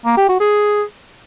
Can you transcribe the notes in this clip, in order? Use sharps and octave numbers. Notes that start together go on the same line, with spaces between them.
A#3
G4
F#4
G#4